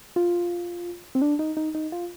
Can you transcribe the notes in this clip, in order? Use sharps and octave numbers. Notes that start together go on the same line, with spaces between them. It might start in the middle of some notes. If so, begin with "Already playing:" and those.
F4
C4
D4
D#4
D#4
D#4
F4